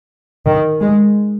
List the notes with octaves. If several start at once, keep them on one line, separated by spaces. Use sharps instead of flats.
D#3
G#3